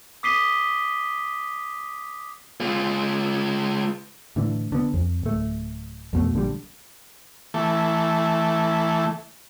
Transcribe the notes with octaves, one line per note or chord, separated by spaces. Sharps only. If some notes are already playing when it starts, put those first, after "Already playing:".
D6 D#6 B6 C7 D#7 G7
G#3 F4
A2 D3 E3
D3 B3
F2
D1 A3
F2 B2 A3
A#1 D3 G3
E3 A3